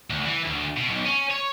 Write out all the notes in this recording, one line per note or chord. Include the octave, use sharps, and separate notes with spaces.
D2
E3
D2
B2
B1
C#4
C#5